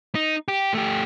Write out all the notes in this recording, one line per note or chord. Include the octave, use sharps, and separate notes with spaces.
D#4
G4
A3 G4